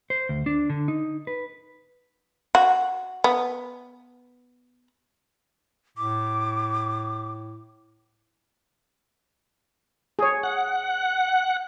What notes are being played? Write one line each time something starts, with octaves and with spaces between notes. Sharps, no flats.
C5
D2
D4
D3
D#4
B4
F#4
B3
A2 D6
G#4 C#5
F#5